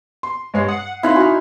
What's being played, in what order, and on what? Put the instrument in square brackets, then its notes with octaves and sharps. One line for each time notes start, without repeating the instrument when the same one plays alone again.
[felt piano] C6
[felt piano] G2 C#5 C7 [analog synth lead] G#3
[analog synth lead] F#5 [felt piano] D#6
[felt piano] C4 F5 F#6 [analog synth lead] D#4 [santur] E4 C6
[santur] F#4 [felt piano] G#5 F6